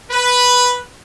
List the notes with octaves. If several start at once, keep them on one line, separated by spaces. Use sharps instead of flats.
B4